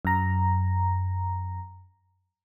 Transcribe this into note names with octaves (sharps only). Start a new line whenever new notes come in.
F#2 A#5